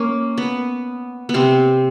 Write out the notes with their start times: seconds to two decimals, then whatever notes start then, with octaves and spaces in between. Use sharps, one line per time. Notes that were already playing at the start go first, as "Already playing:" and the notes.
Already playing: A#3 C#4
0.38 B3
1.29 B3
1.34 C3 C4